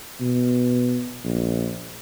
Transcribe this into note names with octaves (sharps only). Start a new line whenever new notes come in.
B2
A#1